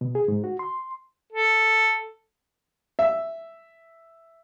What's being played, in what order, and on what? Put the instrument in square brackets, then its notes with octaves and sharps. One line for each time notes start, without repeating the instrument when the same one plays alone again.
[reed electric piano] B2
G#4
G#2
F#4
C6
[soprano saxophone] A4
[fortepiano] E5